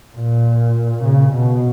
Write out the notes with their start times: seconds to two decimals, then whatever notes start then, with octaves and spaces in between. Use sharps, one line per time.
0.16 A#2
1.05 C#3
1.33 B2